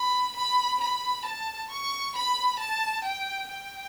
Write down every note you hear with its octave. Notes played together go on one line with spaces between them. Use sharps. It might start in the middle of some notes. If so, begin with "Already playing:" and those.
Already playing: B5
B5
B5
A5
C#6
B5
A5
G5
G5